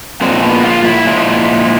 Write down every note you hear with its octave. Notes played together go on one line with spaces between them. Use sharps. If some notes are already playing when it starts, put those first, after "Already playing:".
A#2 F3 G#3 C4
B3
F#4
F4
E4
A#2 F3 G#3